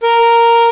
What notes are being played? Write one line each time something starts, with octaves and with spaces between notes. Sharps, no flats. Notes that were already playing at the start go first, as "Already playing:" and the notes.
A#4